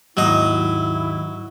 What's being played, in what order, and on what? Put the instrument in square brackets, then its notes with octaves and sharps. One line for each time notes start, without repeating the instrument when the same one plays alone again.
[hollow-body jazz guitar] D#2 G#2 [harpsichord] F#3 D#5 [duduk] E4